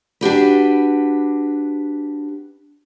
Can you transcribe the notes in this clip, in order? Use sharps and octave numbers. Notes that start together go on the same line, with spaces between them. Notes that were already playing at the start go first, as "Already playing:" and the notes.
D4 F#4 G4 B4